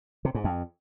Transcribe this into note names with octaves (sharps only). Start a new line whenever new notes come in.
C3
G#2
F2